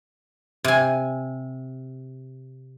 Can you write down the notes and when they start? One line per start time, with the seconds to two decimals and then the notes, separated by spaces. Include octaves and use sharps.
0.64 C3 G#5